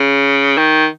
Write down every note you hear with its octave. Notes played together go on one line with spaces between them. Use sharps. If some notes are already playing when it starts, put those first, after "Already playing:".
Already playing: C#3
D#3